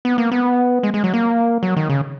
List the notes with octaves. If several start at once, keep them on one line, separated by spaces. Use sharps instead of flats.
B3
A#3
B3
G#3
G#3
F#3
A#3
F#3
D#3
C#3